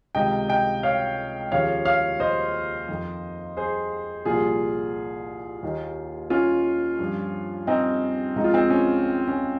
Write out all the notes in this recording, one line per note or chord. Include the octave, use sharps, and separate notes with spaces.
C#2 C3 D#3 D#5 G5
D#5 G5
C#5 F5
D#2 C#3 F3 C#5 F5
C#5 F5
C5 D#5
F2 D#3
G#4 C5
C2 A#2 F3 F4 G#4
D#2 D#3
C#4 F4
G2 F3
C4 D#4
C#2 C#3 F3 D#4
F4
C4 D#4
C#4
C#4